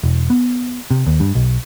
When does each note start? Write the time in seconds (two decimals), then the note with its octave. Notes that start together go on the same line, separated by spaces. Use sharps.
0.03 E1
0.30 B3
0.91 C3
1.07 D#2
1.20 G2
1.35 B1